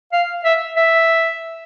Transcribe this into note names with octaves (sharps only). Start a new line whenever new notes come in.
F5
E5
E5